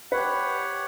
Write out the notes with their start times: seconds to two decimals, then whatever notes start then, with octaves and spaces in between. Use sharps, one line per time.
0.11 G4 B4 C#5 F#5